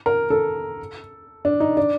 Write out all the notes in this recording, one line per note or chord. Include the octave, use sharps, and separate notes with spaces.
A#4
A4
D4
D#4
D4